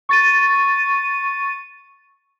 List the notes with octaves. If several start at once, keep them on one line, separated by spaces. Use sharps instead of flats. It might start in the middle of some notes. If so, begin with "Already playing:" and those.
C#6 A6 D#7